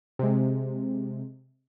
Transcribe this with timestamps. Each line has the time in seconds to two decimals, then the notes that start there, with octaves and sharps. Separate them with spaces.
0.19 C3 G#3